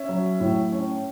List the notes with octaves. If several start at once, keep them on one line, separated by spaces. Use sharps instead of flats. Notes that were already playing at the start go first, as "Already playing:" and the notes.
Already playing: C#4 E5
F#3
A2
C#4